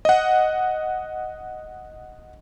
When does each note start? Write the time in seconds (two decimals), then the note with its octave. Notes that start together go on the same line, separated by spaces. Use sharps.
0.05 D#5 F#5